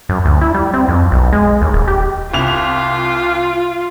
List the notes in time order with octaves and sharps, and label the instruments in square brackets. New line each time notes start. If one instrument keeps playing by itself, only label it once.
[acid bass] F#2
D2
E4
G3
C4
F2
B1
G#3
D#2
D#1
G4
[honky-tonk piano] C2 F7 [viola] F4